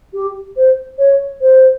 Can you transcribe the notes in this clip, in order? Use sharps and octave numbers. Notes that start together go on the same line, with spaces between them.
G4
C5
C#5
C5